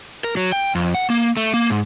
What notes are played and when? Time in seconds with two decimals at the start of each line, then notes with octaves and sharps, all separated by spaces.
0.24 A#4
0.37 F#3
0.52 G5
0.75 F2
0.95 F#5
1.10 A#3
1.37 A3
1.54 A#3
1.70 G#2